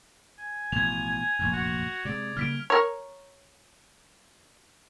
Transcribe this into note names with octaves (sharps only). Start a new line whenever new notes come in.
G#5
A1 B2 F3 G#6 F7
F1 A#1 F#2
F#4
C3 G#3 D5
C#3 G3 A#3 F6 B6 D7
A#4 C#5